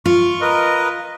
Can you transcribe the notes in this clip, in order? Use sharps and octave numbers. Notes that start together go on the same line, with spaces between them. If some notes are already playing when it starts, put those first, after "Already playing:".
F4 C#6
A#4 B4 D#5